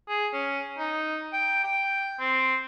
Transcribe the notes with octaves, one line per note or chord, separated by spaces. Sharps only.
G#4
C#4
D#4
G5
G5
C4